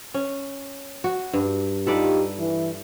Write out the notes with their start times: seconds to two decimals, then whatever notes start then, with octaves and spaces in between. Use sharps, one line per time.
0.14 C#4
1.04 F#4
1.33 G2
1.87 D#4 F4 G4 A4 B4 D5
2.39 E3